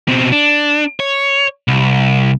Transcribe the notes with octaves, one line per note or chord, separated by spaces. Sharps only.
B2 C4
D4
C#5
C2